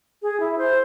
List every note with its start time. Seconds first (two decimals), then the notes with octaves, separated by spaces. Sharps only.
0.22 G#4
0.40 E4
0.58 C5